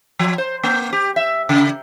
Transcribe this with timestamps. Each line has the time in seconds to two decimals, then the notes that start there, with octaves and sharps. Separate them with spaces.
0.19 F3
0.38 C5
0.63 A#3
0.93 G4
1.16 E5
1.49 C#3